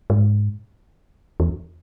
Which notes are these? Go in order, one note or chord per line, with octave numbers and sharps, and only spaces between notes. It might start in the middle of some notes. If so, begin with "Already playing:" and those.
G#2
E2